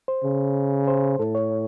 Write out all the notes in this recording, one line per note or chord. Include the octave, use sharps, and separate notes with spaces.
C5
C#3
C5
A2 A4
C#5